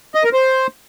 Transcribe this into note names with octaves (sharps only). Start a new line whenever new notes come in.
D#5
A#4
C5